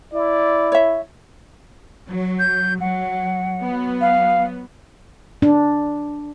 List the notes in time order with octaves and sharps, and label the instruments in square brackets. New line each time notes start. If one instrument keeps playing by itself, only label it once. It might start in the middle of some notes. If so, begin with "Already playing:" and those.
[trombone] E4 [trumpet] D5
[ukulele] C#5 E5
[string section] F#3
[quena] G6
[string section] F#3 [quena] F#5
[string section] F#3 B3
[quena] F5
[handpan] D4